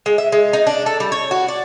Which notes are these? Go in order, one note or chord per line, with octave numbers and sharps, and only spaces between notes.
G#3
E5
G#3
D#4
D4
A4
G3
C#5
F#4
D5